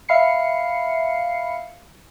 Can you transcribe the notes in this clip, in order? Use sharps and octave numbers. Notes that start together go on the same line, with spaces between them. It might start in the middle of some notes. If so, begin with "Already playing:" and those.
E5 F5 B5 C7 C#7